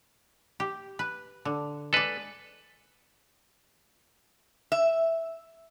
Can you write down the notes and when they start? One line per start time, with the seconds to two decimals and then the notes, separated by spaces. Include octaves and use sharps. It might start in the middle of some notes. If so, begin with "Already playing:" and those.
0.60 G4
0.99 B4
1.45 D3
1.93 G#3 A4 B4 D5
4.72 E5